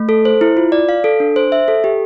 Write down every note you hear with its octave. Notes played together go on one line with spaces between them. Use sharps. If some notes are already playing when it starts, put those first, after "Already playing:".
Already playing: A3
A4
C5
E4
F4
D5
F5
A4
D4
C5
E5
A4
G4